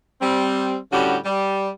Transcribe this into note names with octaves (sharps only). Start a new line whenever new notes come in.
G3 C4
A2 D3 G3 C#4 F#4 G4
G3